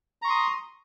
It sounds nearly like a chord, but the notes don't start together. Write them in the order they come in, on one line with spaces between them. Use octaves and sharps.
A#5 C#6 C6 D#6